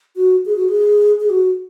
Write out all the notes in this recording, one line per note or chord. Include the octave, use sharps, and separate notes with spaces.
F#4
G#4
F#4
G#4
G#4
F#4